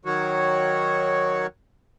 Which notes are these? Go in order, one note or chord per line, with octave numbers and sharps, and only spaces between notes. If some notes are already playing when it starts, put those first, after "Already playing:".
D#3 F#3 F#4 C#5